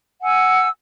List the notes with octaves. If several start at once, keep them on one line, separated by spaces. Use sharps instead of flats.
F#5 G#5 E6